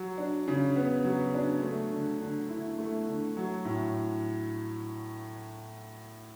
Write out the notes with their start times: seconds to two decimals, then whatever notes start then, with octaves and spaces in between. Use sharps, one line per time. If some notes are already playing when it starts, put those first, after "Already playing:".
Already playing: F#3
0.18 D4
0.48 C#3
0.76 B3
1.04 F#3
1.34 D4
1.62 A3
1.92 D3
2.21 D3
2.49 E4
2.78 A3
3.07 D3
3.37 F#3
3.65 A2